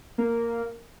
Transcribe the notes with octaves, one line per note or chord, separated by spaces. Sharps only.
A#3